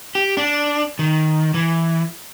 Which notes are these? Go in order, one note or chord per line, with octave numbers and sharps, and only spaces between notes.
G4
D4
D#3
E3